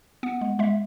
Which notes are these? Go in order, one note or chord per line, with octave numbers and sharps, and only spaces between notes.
B3 F#5
G#3
G#3 E5